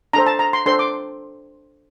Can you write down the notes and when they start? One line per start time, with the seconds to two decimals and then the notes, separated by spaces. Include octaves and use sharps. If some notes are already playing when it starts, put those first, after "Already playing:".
0.13 D4 A4 C5 A#5
0.26 A5
0.39 A#5
0.53 C6
0.66 D4 A4 C5 C6
0.79 D6